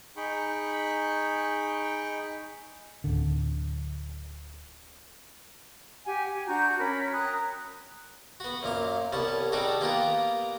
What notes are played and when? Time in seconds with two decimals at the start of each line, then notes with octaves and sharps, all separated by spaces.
0.17 D#4 G#4 G5 B5 C#6
3.04 D1 D3
6.05 G4 F#5 G#5
6.33 F#5 G#5
6.47 D4 F#4 A#5 G6
6.79 C#4 A#4 B5
7.12 G5 A#5 D#6 F#6
8.40 B3 F#4
8.63 F#2 A#2 F5 C6
9.13 C2 B3 C#4 A5
9.52 G3 D4 D#4 F#4 G#4 A4
9.81 A#3 B3 F4 G4 A#4 F#5